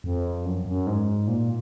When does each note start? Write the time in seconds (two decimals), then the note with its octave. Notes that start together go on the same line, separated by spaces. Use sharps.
0.04 F2
0.45 F#2
0.66 F#2
0.87 G#2
1.28 A#2